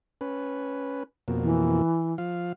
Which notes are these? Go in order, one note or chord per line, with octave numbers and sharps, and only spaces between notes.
C#4 B4
F2 B2 A#3
E3
F3 F5